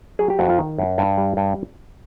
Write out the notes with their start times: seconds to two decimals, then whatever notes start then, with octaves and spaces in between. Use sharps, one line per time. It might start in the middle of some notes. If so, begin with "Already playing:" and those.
0.19 F#3 G#4
0.30 G4
0.39 F2 F#4
0.50 F4
0.59 D#3
0.78 F#2
0.98 G2
1.18 G3
1.37 G2